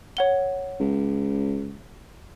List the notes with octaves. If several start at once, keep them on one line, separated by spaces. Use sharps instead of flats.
C#5 F#5 G7
C#2